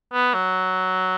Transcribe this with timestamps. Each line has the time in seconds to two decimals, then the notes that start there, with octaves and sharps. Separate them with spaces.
0.14 B3
0.34 F#3